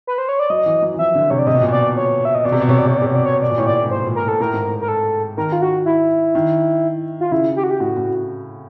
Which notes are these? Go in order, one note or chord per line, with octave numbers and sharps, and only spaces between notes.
B4
C5
C#5
D5
F#3 D#5
E3
F#3
E3
F3 E5
D3
C3 C#5
D5
C3 D#5
B2
A#2
B2 D5
C#5
E5
D#5
B2 D5
C3
B2
C3 C#5
B2 D5
C3 C#5
B2
D5
C3
B2 C#5
D5
C#5
B2 D5
A#2
A2 C#5
A#2 D5
G#2
A2 C5
A#2
A#4
A2 A4
A2 A#4
G#2
A2
A#4
A4
D#3 A#4
F4
F#4
E4
D#3
F4
C#3 E4
G4
F#4
G4
A2 F#4
A2